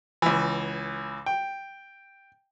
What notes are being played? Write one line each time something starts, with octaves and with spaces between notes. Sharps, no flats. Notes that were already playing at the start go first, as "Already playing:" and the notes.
C#2 E3
G5